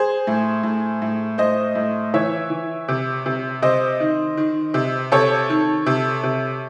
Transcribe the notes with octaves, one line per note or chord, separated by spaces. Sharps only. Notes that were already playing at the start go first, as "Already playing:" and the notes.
Already playing: G#4 C5
A2
A2
A2
A2 C5 D#5
A2
E3 C#5 E5
E3
C3
C3
C3 C5 D#5
D#3
D#3
C3
C3 A4 C#5
D#3
C3
C3